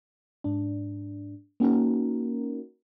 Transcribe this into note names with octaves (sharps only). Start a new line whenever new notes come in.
G#2 D4
A#3 C#4 D#4 F#4 A#4